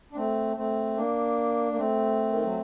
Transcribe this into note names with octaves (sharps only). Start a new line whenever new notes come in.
D4
A3 C4
A3 C4
A#3 D4
A#3
A3 C4
D#3
F#3